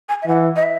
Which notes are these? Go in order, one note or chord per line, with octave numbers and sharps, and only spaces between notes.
G#5
E5
E3 F#5
D#5
E5